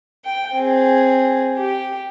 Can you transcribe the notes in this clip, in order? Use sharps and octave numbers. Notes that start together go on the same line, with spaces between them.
G5
C4 G#4
G4